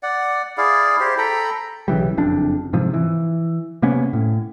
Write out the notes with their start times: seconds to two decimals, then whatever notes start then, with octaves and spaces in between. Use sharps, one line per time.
0.03 D5 F#5
0.57 E4 G#4 D5 F5
1.00 E4 G4 C5
1.18 A4 G5 A#5 B5
1.88 B1 C#3 E3 G3
2.17 F#1 F2 D4
2.73 G#2 C3 F3
2.94 E3
3.82 C3 A#3 B3 C#4
4.13 A2